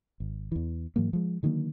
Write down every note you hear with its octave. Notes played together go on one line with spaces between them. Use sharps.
G#1
E2 E3
G#2 E3 F#3 A#3
F3 G#3
D3 D#3 F#3 A#3